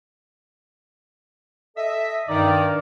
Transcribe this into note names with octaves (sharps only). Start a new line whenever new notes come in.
A4 D#5 E5
G2 D#3 D#4 D5